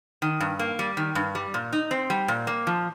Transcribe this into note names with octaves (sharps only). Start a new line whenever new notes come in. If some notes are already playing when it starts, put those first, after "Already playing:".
D#3
G2
A#3
G3
D#3
G2
G3
A#2
D#4
C4
G3
A#2
A#3
F3